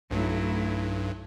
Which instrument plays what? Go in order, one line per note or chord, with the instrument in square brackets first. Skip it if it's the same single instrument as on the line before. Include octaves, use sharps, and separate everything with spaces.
[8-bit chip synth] B1 G2 [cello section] F#3 A3 E4